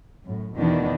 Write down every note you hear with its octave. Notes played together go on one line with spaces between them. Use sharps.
F#2 A2
E2 B2 D#3 E3 B3 D4